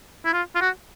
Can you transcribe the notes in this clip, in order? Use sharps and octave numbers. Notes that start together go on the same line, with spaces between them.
E4
F4
F4
F#4